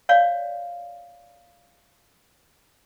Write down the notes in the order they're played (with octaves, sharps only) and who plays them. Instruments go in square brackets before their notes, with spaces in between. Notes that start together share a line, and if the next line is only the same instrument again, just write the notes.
[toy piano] C#5 D5 F5